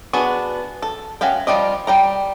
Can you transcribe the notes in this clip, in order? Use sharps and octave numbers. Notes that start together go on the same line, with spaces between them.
B3 D4 F#4 G#4
A4
C#4 F#4 E5 F5 G5
F3 G3 C4 D5 D#5
G3 G5 A#5